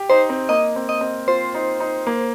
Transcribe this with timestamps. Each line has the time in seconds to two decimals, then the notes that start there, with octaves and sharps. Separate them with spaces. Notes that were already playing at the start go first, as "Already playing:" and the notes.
Already playing: G4
0.10 D#4 C5
0.30 C4
0.49 A#3 D#5
0.76 C4
0.89 D#5
1.01 C4
1.28 F4 C5
1.55 D#4
1.80 D#4
2.07 A#3